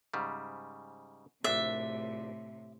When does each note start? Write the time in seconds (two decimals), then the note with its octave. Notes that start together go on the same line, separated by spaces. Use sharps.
0.14 G#2 C#3 G3
1.44 A#1 A2 C3 D4 E5